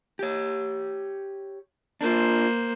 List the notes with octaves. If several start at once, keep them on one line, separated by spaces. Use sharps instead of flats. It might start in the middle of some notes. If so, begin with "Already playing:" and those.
G4 C#5
A#3 D4 F4 C5